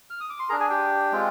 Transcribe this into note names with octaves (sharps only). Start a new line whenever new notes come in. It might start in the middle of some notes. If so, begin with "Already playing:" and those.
F6
D#6
D6
C6
G#4 A#4 A#5
D4
G#4 G#5
G4 G5
G#3 C4 F4